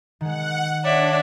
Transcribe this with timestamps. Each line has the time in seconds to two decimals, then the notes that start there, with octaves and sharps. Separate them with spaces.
0.21 D#3 G#3 F#5
0.83 D4 C#5 D5 E5 F#5